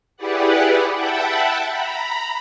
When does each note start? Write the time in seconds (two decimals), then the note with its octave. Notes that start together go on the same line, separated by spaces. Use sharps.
0.17 E4 G4 G#4 B4 D5 F#5
0.94 E5 F#5 G5 A5 B5
1.71 A#5 B5